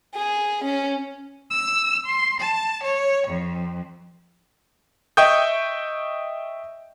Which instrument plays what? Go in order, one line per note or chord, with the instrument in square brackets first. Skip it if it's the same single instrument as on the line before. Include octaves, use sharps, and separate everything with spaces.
[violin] G#4
C#4
[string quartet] E6
C6
A5
C#5
F2
[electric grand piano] D#5 E5 G5 C#6 D#6 G6